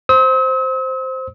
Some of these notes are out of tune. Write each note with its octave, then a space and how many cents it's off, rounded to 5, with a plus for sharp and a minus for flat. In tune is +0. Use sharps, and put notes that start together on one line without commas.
C5 +0 E6 -45